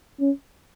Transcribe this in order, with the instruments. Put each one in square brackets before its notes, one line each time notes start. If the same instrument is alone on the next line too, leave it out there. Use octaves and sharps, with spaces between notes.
[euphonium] C#4